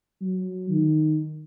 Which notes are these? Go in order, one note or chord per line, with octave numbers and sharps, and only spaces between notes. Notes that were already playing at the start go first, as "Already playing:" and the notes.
F#3
D#3